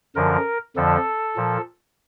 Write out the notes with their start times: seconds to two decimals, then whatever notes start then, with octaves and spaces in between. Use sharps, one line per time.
0.16 F#2 D3 F3 A#4
0.76 F2 D3 F3 A4
1.36 A#2 F3